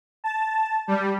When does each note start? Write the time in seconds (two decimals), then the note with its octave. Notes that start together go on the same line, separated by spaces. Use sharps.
0.24 A5
0.88 G3